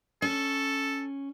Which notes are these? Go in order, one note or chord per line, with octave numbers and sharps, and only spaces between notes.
C#4 A4